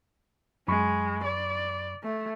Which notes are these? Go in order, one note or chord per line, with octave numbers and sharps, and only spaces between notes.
F#2 G#3 B5 C#6
D5
A3